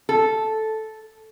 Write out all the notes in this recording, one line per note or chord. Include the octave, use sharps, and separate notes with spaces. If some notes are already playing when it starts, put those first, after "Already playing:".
A4